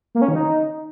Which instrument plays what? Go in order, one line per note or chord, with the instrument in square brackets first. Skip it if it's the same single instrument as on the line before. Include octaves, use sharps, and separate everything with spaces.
[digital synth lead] A#3
C#4
D#3
D#4